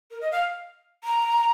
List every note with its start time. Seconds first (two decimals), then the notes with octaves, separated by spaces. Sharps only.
0.11 A#4
0.21 D#5
0.32 F5
1.04 A#5